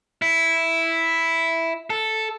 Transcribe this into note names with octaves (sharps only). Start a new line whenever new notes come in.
E4
A4